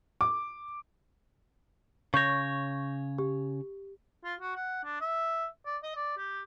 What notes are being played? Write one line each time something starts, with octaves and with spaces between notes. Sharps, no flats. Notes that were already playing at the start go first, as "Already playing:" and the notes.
D6
C#3 C#5 C#6 G6 A#6
G4
F4
F#4
F#5
D4
E5
D5
D#5
D5
G4